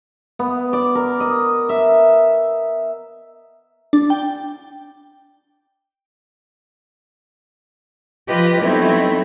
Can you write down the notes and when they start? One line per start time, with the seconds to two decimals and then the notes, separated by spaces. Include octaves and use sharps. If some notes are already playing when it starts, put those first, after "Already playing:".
0.39 B3
0.73 D5
0.95 A#4
1.20 D#5
1.69 E5
3.93 D4
4.10 G5
8.28 F3 F4 G4 B4 D#5
8.60 F#3 A3 B3 C4 D#4 E4